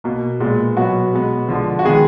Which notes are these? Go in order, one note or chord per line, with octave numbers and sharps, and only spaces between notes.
B2 A#3
A#2 G#3 B3
B2 F#3 B3 F#4
B2 G#3 B3
D3 F3 G#3
F#4
D#3 G#3 B3 G#4